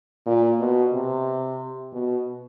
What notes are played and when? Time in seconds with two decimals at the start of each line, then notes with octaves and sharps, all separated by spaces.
0.26 A#2
0.60 B2
0.93 C3
1.93 B2